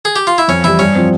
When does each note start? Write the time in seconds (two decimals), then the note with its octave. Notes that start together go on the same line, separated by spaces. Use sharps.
0.05 G#4
0.16 G4
0.27 F4
0.38 E4
0.48 F2 C#4
0.64 E3 G3 E4
0.79 G2 C#4
0.95 F3 C4